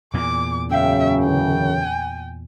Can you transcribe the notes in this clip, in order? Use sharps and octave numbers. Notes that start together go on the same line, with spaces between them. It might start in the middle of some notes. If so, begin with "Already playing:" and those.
E2 A#2 D6
F#2 C#3 E5 F5 G5
D3 E3 G5
G#5